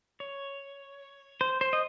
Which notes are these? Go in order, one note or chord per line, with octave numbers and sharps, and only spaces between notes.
C#5
C5
C5
D#5